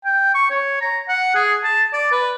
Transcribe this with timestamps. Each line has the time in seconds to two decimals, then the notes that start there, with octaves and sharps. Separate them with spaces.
0.05 G5
0.35 C#6
0.50 C#5
0.81 A#5
1.08 F#5
1.35 G#4
1.64 A5
1.93 D5
2.12 B4